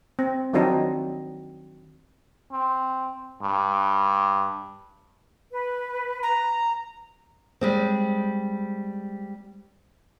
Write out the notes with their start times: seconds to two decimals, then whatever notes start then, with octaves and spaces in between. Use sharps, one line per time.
0.19 C4
0.53 D#3 F3 F#3 C4 D4 D#4
2.52 C4
3.42 G2
5.52 B4
6.23 A#5
7.61 G3 G#3 C4